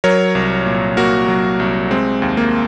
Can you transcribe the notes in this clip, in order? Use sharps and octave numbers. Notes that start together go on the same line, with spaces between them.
F#3 A#4 C#5
C2
A#2
A#3 F#4 A#4
F#3
C2
G#3 C4
D#2
A#3